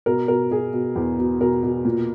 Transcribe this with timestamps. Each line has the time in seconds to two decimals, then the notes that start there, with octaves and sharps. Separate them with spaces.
0.06 B2 A#4
0.28 B2 A#4
0.51 B2 G#4
0.73 B2
0.96 E2
1.19 B2
1.40 B2 A#4
1.63 B2
1.85 A#2